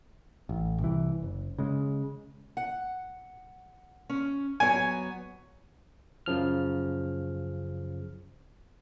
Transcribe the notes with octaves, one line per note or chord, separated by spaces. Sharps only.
A1
C2 E3
F#1
C#3 G#3
F#5
C#4
F#3 B3 C#5 G#5
F#2 C#3 F3 F6